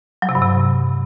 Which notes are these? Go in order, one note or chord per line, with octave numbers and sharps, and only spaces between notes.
F#3
C3
G2
C3